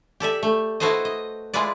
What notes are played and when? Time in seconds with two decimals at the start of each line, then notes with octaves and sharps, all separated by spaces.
0.20 G4 A4 D5 E5
0.43 A3
0.80 E4 F#4 A4 B4 C5 D#5
1.05 D#5
1.54 G#3 E4 F4 B4 D5